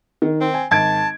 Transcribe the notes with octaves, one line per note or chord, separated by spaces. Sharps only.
D#3
C4
G#5
G#1 A5 G#6 D7